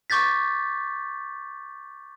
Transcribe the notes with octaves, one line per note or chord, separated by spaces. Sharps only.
C#6 D6 G6 A6 B6